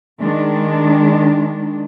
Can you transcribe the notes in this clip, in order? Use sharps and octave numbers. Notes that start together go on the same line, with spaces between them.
D#3 G#3 D4